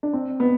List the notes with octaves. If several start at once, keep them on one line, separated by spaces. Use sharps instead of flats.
D4
C4
B3